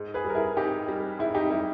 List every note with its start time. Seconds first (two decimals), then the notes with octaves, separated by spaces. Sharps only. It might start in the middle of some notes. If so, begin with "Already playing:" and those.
Already playing: G#2
0.14 G#4 B4
0.25 G3
0.30 A#4
0.35 E4 G#4
0.57 G#2 D#4 G4
0.88 G3
1.19 G#2 E4
1.35 D#4 G4
1.50 G3 E4